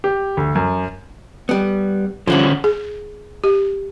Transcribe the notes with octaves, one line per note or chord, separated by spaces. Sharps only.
G4
D2
F#2
G3 B3
G2 D3 E3 F3 C#4 F#4
G#4
G4